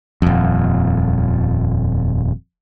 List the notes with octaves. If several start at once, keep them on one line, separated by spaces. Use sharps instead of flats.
D#1 F2